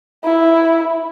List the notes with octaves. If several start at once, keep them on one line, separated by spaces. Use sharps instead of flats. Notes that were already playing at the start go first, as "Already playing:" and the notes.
E4